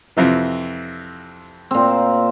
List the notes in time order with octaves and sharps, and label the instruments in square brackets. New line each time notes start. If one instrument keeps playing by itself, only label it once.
[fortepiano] F2 C3 E3
[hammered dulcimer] A#2 C4